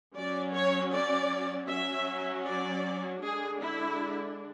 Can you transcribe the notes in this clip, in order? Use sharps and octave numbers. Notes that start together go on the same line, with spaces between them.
F#3 C#4 D5
C#5
D5
F#3 C#4 E5
D5
D3 G#3 D4 G#4
E4